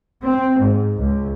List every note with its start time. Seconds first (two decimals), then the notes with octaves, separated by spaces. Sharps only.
0.25 C4
0.60 G#2
0.98 C#2